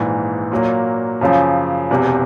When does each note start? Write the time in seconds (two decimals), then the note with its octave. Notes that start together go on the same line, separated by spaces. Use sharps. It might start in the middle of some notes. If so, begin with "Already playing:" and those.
Already playing: A#1 G#2 E3
0.52 A#2 F#3 A#3
1.21 F#2 C#3 F3
1.91 E1 E2 C3